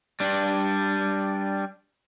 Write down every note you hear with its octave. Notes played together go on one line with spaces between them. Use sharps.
G3 D4